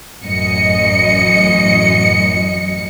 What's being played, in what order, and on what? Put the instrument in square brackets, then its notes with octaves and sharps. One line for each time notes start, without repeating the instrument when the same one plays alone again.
[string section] A1 F#2 D#5 C#7